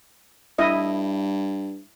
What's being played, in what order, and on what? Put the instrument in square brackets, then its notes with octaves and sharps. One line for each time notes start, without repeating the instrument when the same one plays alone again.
[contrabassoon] G2 [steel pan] E4 D#5